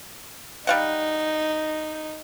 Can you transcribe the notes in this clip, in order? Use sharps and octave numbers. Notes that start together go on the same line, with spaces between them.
G3 D#4 F5 F#5